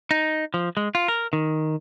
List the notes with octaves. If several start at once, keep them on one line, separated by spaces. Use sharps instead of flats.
D#4
F3
G#3
F4
A#4
D#3